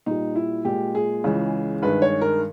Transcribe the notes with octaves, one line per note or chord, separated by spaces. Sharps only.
A#2 G3 D#4
E4
A#2 G#3 G4
G#4
C#2 C#3 E3 G#3
G2 D#3 G#3 B4
C#5
A#4